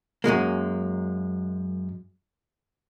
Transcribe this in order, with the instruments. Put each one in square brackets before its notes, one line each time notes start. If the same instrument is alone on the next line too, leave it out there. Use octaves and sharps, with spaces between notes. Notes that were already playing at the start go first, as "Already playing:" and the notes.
[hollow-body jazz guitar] F#2 A#2 G#3 A#3